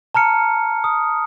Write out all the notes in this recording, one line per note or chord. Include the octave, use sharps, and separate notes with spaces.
A5 A#5 F6 C#7
D#6